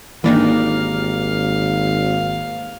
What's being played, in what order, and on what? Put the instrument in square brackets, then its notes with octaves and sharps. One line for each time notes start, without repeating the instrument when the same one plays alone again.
[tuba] G#1 [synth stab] E3 D4 D#4 [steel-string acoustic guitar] A#3 G4 [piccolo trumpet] F5